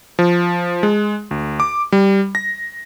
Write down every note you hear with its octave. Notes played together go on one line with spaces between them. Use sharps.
F3
G#3
D2
D6
G3
A#6